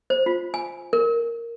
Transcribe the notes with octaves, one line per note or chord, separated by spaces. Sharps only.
C5
F4
G#5
A#4